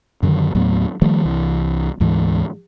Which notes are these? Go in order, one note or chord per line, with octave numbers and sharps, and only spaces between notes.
F#2 D3 D#3 F#3
D#2 A2 F#3 B3
D#3 F3 G3 A3
C2 E3
D2 G#2 E3 G#3